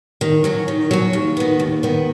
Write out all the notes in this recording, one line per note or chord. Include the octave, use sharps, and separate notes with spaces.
D#3
F#3 C#4
D#3
F#3 C#4
D#2
D#3 B3
D#2
D#3 B3